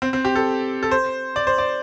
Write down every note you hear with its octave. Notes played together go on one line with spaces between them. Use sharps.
C4
C4
G4
A4
A4
C5
D5
C5
D5